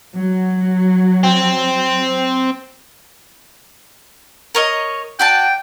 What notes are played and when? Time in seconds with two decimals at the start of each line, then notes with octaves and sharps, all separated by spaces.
0.16 F#3
1.24 C4
4.55 A#4 C#5 D#5
5.19 F#4 D5 G5 A5